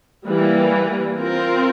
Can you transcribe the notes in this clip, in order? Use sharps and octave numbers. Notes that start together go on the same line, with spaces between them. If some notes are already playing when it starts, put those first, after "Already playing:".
E3 G3 A#3
C4 F4 A#4